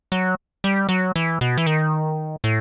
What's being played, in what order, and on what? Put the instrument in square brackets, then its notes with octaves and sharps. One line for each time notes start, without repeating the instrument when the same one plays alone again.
[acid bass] F#3
G3
F#3
E3
B2
E3
D#3
A2